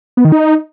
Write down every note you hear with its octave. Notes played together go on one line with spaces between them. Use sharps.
B3
D#3
D#4